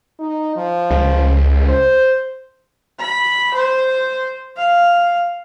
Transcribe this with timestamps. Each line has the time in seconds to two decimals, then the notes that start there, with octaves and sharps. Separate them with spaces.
0.19 D#4
0.56 F3
0.90 C#2
1.68 C5
2.99 B5
3.54 C5
4.57 F5